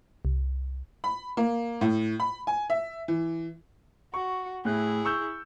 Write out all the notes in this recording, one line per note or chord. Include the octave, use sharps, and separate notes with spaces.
C2
B5
A#3
A2
B5
G#5
E5
E3
F#4 C#6
A2 E4 G#4 F#6
C#6 E6 G6